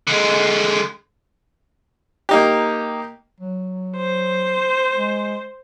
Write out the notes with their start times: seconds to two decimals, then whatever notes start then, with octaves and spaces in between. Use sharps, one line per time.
0.07 D3 G#3
2.29 A#3 D#4 G4
3.40 F#3
3.97 C5
4.95 G#3